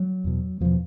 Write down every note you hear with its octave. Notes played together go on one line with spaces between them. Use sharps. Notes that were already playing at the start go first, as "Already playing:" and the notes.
Already playing: F#3
E2 B2
E2 B2 F3